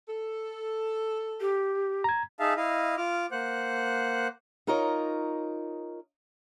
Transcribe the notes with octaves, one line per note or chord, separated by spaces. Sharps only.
A4
G4
A#5 G#6
D#4 G#4 E5 F5 A5
E4 D#5 F5
F4 D6 F6
A#3 C5 F#5 F#6
D#4 F4 A#4 C#5 D#5